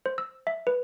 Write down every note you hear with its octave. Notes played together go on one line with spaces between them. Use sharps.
C5
E6
E5
B4